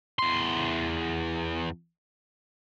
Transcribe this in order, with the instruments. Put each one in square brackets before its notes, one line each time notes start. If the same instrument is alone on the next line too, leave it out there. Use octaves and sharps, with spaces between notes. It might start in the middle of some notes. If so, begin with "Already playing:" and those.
[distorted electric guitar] E2 C6